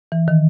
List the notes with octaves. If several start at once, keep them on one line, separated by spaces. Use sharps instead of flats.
E3
D#3